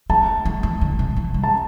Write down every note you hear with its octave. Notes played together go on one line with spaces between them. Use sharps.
A3 A5
A3
E3
D3
C3
E3
G3
A5